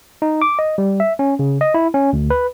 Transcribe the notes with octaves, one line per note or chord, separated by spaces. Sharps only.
D#4
D6
D#5
G3
E5
C#4
C#3
D#5
E4
C#4
D2
B4